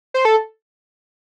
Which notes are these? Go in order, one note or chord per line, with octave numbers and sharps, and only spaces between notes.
C5
A4